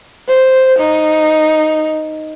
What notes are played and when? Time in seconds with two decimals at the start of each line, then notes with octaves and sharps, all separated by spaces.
0.29 C5
0.79 D#4